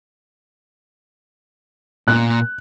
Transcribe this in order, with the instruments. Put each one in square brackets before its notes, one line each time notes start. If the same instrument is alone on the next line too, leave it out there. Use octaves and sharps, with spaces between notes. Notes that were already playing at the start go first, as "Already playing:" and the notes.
[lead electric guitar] A#2 [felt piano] F#6